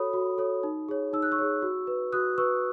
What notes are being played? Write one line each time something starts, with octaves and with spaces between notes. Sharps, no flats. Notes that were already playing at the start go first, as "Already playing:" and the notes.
Already playing: F#4 A4 C#5 B5 D#6
F#4
A4 C#5
D#4
G#4 C#5
D#4 E6
F#6
C#6 E6
G#4 C#5
F#4
B4
F#4 D#6 F#6
B4 C#6 E6